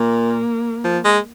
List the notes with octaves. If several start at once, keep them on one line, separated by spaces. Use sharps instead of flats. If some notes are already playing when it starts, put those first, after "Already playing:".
Already playing: A#2 A#3
F3
G#3